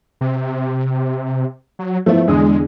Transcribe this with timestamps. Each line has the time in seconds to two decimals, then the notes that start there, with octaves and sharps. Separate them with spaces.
0.21 C3
1.79 F#3
2.06 F3 A3 B3 E4
2.27 E2 D3 G#3 D#6